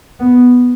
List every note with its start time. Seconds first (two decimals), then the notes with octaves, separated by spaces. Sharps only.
0.20 B3